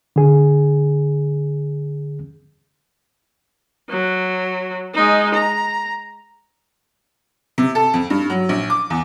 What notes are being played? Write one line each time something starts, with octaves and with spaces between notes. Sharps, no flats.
D3 G#4
F#3
G#3 D#4
A#5
C3
A4
F2
G2
F#3
A#1
D6
E2